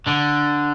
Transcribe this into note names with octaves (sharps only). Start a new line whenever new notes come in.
D3